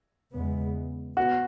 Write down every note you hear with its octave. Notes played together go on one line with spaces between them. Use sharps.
E2 C#3 G#3 B3
B3 F#4